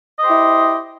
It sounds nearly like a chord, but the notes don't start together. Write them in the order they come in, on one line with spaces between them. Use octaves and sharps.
D#5 C5 G4 E4